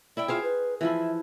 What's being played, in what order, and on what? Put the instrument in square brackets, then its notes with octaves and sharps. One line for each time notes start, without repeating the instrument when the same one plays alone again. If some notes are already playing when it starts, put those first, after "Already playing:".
[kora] E4 E5 G5 [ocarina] D5
[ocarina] F4 [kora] G#4 C5 F5
[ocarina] B4
[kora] E3 F3 E4 [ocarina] E5